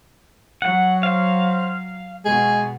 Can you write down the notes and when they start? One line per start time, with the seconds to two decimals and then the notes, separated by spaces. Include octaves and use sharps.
0.62 F#3 F#5
1.03 C5 F5
2.25 B2 G#3 G#4